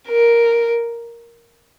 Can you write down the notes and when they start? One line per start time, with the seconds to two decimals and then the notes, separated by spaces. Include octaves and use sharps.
0.08 A#4